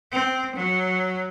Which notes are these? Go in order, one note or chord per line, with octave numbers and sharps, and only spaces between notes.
C4
F#3